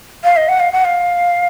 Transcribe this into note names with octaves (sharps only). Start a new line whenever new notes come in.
F5
D#5
F#5
F5
F#5
F5